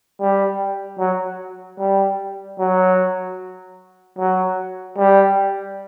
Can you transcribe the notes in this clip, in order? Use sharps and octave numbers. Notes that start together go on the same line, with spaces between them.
G3
F#3
G3
F#3
F#3
G3